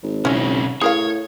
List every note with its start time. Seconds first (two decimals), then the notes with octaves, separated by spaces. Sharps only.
0.03 G#1
0.25 B1 C#3 C#4 E4
0.82 A2 G#4 A#4 C#5 F5